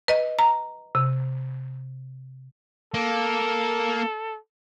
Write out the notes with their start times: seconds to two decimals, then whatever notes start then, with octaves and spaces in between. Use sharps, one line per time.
0.08 B4 D#5
0.39 A#5
0.95 C3
2.94 A#3 A4